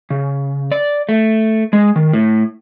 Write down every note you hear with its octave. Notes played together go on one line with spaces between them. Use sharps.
C#3
D5
A3
G#3
D#3
A2